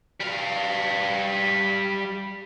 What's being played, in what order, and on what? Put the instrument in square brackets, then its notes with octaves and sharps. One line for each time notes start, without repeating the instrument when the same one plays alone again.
[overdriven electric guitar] G3 F5